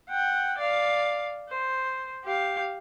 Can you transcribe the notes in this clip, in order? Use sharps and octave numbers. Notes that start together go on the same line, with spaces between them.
F#5 G5
D5 F5
C5
G4 F5